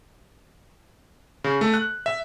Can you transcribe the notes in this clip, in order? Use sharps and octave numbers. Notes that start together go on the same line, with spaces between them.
C#3
A3
F#6
E5